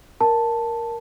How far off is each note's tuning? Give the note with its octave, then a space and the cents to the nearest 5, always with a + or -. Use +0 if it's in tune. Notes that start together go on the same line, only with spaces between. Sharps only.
A#4 +0 A5 +0